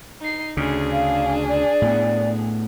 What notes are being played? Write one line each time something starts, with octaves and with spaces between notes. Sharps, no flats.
D#4 C7
D2 C#3 D4 G#4
F5
D5
A2 B3